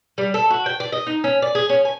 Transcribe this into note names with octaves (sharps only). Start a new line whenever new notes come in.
G3
A4
F#4
G5
D5
D#5
D#4
C#4
D5
G#4
C#4
G#5